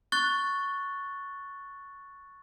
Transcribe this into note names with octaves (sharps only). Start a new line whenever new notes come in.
C#6 F#6 A6 G7